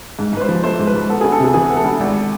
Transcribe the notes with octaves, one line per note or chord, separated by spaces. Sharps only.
G#2
G#2 B4
C5
F3
A3 C5
G#2
B4
G#2
B3 A4
D2 G#4
A4
C3 G#4
E3 G#4
B3
A4
D2
G#1